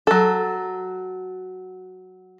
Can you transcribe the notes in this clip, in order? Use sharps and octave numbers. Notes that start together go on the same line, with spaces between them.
F#3 A4